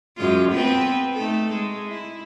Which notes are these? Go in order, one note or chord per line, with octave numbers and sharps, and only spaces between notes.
F#2 G#3 F4
B3 C4 B4
A3 D#4 A4
G#3
E4